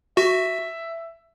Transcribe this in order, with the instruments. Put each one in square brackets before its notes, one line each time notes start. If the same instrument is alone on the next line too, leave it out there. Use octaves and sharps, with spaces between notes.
[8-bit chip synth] F#4 [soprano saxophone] E5